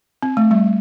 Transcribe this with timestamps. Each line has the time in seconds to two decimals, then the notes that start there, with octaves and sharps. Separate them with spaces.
0.22 C4
0.37 A3
0.51 G3